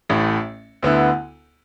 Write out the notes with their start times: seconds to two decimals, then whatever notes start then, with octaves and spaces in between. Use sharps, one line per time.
0.09 A1 A2 A3
0.82 D2 D3 B3 E4